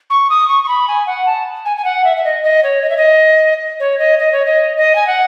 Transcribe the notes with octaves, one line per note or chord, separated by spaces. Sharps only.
C#6
D#6
C#6
C#6
B5
G#5
F#5
A5
G#5
G#5
F#5
E5
E5
D#5
D#5
C#5
D#5
E5
D#5
C#5
D#5
D#5
C#5
D#5
D#5
G#5
F#5